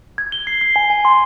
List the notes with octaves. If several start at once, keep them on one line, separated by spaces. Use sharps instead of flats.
G#6
G7
C7
C7
G#5
G#5
C6